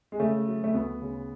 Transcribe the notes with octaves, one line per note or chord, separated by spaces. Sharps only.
G#3
C#3 A3
F#3
A3
D2 B3
C#3